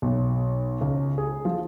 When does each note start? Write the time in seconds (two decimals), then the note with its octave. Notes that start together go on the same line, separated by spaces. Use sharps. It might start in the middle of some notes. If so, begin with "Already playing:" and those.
0.02 B1
0.81 C#2
1.18 G#4
1.45 F3